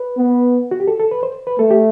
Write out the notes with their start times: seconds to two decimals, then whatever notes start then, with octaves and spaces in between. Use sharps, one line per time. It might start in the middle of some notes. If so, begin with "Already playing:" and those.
Already playing: B4
0.18 B3
0.71 F#4
0.80 G4
0.88 A4
1.00 A4
1.11 B4
1.23 C5
1.47 B4
1.59 A3 A4
1.71 G4